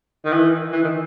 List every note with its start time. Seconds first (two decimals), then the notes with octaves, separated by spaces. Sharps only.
0.24 D#3
0.33 E3
0.72 E3
0.83 D#3